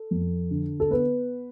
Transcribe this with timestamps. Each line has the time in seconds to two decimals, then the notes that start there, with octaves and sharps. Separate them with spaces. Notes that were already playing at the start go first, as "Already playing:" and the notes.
Already playing: A4
0.11 F2
0.51 D3
0.80 A4
0.91 B3 B4